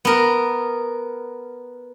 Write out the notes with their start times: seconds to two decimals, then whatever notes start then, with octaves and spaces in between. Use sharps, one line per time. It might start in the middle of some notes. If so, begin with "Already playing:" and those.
0.05 B3 A#4